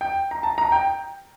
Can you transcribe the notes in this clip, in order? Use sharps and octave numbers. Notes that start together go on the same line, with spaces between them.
G5
A#5
A5
A#5
G5